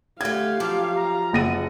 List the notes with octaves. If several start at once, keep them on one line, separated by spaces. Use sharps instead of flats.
D3 A3 G4 F5 G#6
F3 F#3 D6
A#5
F#1 F#5 A#6 D#7